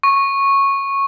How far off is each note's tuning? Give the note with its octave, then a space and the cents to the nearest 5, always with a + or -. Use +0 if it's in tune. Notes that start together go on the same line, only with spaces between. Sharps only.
C#6 -10